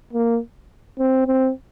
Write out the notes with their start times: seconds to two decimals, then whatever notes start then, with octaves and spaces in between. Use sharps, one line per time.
0.13 A#3
0.99 C4
1.27 C4